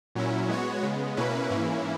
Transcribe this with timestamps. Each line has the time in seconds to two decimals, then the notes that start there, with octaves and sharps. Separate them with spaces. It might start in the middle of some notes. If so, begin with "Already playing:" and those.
0.15 A#2 F#3 C#4 E4
0.49 G#3 B3 F#4 C#5
0.82 C#3 G#3 B3
1.17 B2 A#3 C#4 E4 B4
1.50 G#2 E3 A#3 C#4 E4